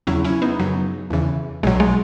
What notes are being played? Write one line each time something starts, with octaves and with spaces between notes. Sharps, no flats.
E2 C#3 F#3 C#4 E4
C#4 E4
B3 D#4
F#2 C#3 F#3
E2 C#3 E3
B1 B2 F#3 G#3
G#3